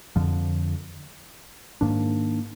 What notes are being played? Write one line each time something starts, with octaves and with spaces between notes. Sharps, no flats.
F2 D3 F3
G#2 D#3 A#3 D4